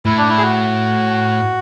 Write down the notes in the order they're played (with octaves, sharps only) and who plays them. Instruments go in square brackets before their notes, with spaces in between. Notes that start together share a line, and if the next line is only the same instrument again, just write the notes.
[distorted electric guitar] A2 [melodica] E4
[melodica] D4
E4
G#4
F#4